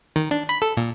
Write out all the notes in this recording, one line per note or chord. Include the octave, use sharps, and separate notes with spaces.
D#3
D4
B5
A4
A#2